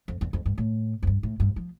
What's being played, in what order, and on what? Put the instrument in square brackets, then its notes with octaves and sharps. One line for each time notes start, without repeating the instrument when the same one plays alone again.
[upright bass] F2
E2
F2
G2
A2
F2
G2
A2
G2
F3